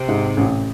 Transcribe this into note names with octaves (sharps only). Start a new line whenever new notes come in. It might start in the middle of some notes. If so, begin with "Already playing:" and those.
Already playing: C3
G#2
A1